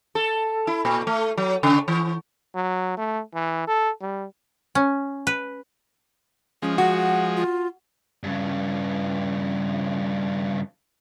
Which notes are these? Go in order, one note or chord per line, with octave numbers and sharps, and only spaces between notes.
A4
E4
A#2
A3
F#3
C#3
E3
F#3
A3
E3
A4
G3
C#4
B4
F3 G#3 C#4
F#4 F#5
F4
G2 C#3